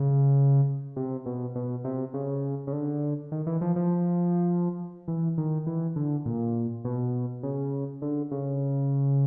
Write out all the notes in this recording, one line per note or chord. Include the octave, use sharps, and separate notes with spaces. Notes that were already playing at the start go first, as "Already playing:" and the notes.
Already playing: C#3
C3
B2
B2
C3
C#3
C#3
D3
D#3
E3
F3
F3
E3
D#3
E3
D3
A#2
B2
C#3
D3
C#3